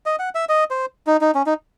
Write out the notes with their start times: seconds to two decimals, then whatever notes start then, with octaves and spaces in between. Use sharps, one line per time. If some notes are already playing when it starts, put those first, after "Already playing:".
0.06 D#5
0.19 F#5
0.35 E5
0.49 D#5
0.70 C5
1.07 D#4
1.21 D#4
1.35 C#4
1.46 D#4